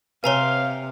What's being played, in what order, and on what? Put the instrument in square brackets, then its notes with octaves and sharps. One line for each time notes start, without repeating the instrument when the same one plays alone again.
[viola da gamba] C3 [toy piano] B4 C#5 [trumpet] F5 [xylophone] G#5 A#5 C6